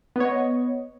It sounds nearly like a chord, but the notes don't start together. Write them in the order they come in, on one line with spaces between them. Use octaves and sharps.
B3 C#5 D#5